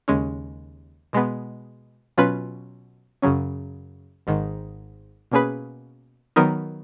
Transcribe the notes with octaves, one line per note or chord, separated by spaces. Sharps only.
D#2 C#3 G#3 C#4
B2 G#3 B3
B2 F#3 C#4 F4 B4
F#2 C#3 F#3 C#4
G#1 G#2 D#3
B2 A#3 C#4 G#4 B4
D#3 F#3 B3 D#4 A#4